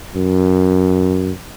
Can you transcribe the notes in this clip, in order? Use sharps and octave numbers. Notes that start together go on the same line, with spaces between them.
F#2